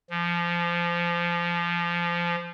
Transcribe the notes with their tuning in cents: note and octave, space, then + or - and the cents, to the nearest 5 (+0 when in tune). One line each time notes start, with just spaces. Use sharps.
F3 -20